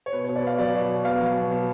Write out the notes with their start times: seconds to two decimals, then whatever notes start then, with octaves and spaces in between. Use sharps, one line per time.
0.06 C#5
0.12 B2 B4
0.24 C#5
0.29 B2
0.36 D5
0.43 B3 F5
0.58 F#3 D5
0.74 B2
0.90 B2
1.05 B3 F5
1.21 F#3
1.36 B2
1.51 B2